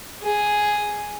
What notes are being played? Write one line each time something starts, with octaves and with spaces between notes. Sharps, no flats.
G#4